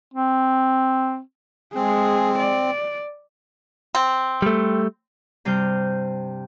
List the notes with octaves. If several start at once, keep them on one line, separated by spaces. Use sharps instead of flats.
C4
G#3 C4 G#4
D5
C4
G3 A3
G2 C3 G3 C5 F6 G6